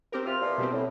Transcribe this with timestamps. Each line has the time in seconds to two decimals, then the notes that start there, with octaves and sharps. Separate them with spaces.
0.12 C4 G4 A#4
0.26 C3 F4 F6
0.41 A#2 E3 F3
0.58 B2 G3 C4
0.72 A2